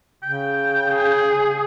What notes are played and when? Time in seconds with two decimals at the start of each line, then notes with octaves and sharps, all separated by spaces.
0.23 C#3 G5
0.91 G#4